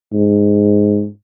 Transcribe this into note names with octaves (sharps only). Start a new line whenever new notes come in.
G#2